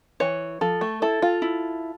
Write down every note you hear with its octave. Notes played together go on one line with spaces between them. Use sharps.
E3 C#5
F3 A4
A3
E4 A4
F4
E4